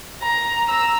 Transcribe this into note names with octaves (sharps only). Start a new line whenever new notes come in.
A#5
A#5 E6